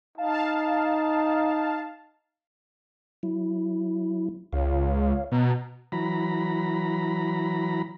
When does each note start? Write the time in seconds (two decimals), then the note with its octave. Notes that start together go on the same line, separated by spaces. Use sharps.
0.18 D#4 F5 A5
3.23 F#3 E4
4.53 C#2 C#5 F5
5.32 B2 A#5
5.92 E3 F#3 A#5 B5